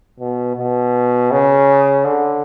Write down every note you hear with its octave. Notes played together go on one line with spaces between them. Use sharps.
B2
B2
C#3
D3